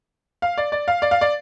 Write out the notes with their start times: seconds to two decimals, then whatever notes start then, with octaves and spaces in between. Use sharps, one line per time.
0.42 F5
0.58 D5
0.72 D5
0.88 F5
1.02 D5
1.11 F5
1.21 D5